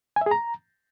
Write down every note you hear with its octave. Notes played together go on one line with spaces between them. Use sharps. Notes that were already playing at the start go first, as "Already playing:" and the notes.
G#5
E5
G#4
A#5